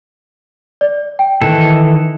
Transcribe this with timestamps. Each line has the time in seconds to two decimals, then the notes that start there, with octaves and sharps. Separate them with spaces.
0.81 D5
1.19 G5
1.42 D#3 E3 A4